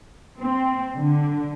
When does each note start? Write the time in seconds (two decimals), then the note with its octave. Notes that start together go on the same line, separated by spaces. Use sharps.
0.39 C4
0.97 D3